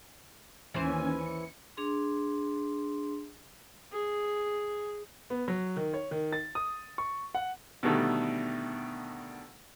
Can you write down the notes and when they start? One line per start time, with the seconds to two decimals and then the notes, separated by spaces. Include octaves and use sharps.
0.74 D#2 E3 C#4 C5 G#5
1.16 C#7
1.77 D4 G#4 C6
3.92 G#4
5.30 B3
5.48 F#3
5.76 D#3
5.94 C#5
6.11 D#3
6.32 A6
6.55 D#6
6.98 C#6
7.35 F#5
7.83 B2 D3 D#3 G3 A3